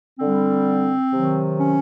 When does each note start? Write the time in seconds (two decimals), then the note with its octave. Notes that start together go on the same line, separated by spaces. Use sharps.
0.19 D3 G3 C4
1.12 C3 D#3 F#3
1.58 C#4